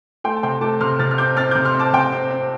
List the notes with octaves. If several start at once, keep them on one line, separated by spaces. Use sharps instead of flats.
A3 G5 C6
A5
C3 G5 C6
A3 A5 D6
C3 C6 F6
C3 F6 A6
F6
C4 D6 G6
C4 F6 A6
C3 D6 G6
C6 F6
C4
A5 D6
C3 G5 C6
C4
C4